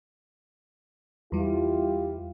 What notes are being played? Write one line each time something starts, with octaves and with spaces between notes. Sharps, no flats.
E2 G3 E4 F4 G4